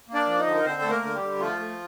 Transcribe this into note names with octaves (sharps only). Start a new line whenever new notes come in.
A#3
D4 D5
F3
D#4 D#5
D3
A#4
D3 C4 C5
A3 A4
A#3 A#4
D3
G3 G4
D3
F3 A3 F4
A3